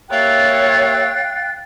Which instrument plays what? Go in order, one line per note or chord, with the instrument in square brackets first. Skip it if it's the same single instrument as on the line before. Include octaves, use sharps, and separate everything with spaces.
[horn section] A#3 G4 E5 [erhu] C#5 [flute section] F5 G5 F#6 [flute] A6